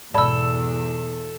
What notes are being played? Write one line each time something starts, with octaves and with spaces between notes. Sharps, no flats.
E2 G#2 B2 A4 D5 A5 B5 E6